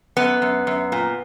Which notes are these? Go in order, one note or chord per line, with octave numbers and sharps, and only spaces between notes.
F#2 B3
F#2
F#2
A#2